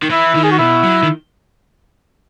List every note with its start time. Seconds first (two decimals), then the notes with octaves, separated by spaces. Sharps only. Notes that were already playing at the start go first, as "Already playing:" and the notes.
0.03 D#3
0.10 E3 E4
0.35 D#3
0.43 G#4
0.51 F#4
0.58 B2 E4
0.83 F#3
1.03 D#3